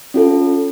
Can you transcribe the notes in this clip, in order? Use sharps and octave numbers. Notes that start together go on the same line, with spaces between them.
C#4 F4 A4